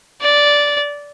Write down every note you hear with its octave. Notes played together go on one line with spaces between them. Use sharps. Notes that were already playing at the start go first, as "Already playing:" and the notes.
D5